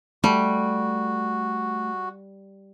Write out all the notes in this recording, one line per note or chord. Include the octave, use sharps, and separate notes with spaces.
G3 A3 F#4